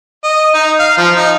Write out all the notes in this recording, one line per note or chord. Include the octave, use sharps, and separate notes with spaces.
D#5
D#4
F5
F3
D#4